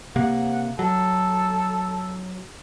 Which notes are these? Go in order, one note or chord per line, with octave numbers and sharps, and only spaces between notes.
C3 A#3 F#5
F#3 A4